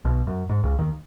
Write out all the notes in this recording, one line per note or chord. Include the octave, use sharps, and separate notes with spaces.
B1 B2
F#2
G#2
C#2 C#3
D#2 D#3